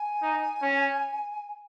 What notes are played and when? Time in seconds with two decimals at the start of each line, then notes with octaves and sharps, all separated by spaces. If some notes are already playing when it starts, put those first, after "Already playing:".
Already playing: G#5
0.22 D#4
0.62 C#4